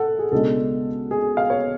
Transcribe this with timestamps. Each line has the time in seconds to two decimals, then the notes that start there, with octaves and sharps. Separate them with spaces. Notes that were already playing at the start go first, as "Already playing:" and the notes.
Already playing: A4 F#5
0.19 G#4
0.32 C#2 B2 G#3 D4 A4
1.11 G#4
1.37 F5
1.50 C#5